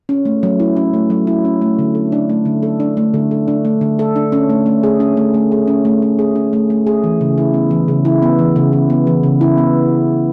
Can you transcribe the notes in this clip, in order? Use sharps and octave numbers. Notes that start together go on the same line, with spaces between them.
C#4
A3
F#3
E4
C#4
A3
F#3
E4
C#4
A3
D3
A4
D4
A3
D3
A4
D4
A3
D3
A4
D4
A3
D3
A4
D4
C#4
A3
A3
G#4
C#4
A3
A3
G#4
C#4
A3
A3
G#4
C#4
A3
A3
G#4
E3
C#3
E4
B3
E3
C#3
E4
B3
E3
C#3
E4
B3
E3
C#3
E4
B3